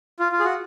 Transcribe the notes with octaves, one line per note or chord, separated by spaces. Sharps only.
F4
F4
G#4
F#4